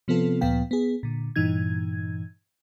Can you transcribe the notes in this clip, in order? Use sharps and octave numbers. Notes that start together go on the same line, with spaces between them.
C3 F3 B3 C4 F4 A4
D2 A#2 F3 B3 F5 G5
B3 G#4
A#2 D3
G2 A#2 E3 D#4 G#6